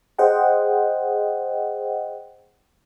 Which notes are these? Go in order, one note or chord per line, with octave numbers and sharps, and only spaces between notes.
G#4 C5 D#5 F#5 G5